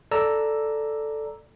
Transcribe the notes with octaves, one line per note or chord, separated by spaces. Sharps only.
A4 D5 A#5 E6